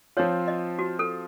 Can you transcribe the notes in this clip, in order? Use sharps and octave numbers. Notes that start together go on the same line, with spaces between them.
F3 C4 F4 C#5
D#5
F#4
A4